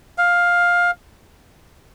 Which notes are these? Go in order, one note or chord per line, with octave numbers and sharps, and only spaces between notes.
F5